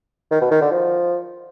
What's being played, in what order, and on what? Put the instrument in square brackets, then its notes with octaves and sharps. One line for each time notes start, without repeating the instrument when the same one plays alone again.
[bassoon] D#3
B2
D#3
D3
F3